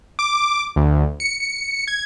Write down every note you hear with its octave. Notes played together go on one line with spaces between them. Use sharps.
D6
D2
C#7
C#7
G#6